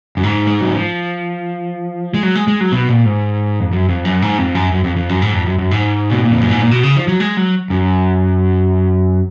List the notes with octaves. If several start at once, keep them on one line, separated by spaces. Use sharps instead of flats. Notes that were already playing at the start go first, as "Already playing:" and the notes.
F#2
G#2
G#3
F#3
F3
G#3
F#3
G#3
G#3
F#3
B2
A#2
G#2
F2
F#2
F2
F#2
G#2
F2
F#2
F#2
F2
F2
F#2
G#2
F2
F#2
F#2
G#2
B2
A#2
F2
F#2
G#2
A#2
B2
C#3
F3
F#3
G#3
F#3
F#2